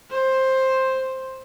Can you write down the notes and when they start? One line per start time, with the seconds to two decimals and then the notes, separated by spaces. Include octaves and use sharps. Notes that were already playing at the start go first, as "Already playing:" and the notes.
0.11 C5